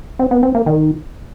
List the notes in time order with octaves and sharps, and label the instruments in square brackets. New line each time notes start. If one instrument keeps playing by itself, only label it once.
[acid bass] C4
B3
C4
A#3
D#3